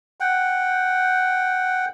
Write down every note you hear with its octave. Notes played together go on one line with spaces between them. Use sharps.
F#5 G5